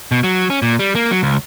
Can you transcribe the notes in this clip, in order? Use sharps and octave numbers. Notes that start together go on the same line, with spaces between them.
B2
F#3
C#4
A#2
G3
A#3
F#3
C#2